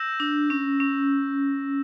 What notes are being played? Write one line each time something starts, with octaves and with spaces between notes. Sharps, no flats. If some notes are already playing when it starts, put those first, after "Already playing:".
Already playing: E6 G6 A#6 E7
D4
C#4
C#4